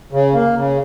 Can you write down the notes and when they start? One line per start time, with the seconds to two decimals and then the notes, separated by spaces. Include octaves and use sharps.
0.12 C#3
0.34 A#3
0.56 C#3